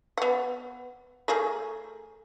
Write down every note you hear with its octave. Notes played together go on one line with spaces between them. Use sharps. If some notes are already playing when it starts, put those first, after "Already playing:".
B3 F#5
A3 G#4 A#4